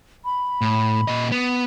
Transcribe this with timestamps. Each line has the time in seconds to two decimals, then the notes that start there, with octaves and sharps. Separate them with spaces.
0.25 B5
0.61 A2
1.08 A#2 D#5
1.32 B3